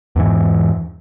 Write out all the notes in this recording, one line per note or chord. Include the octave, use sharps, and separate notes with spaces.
E2 G#2 E3